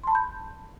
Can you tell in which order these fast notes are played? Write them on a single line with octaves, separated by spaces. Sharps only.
C6 A5 B5 G6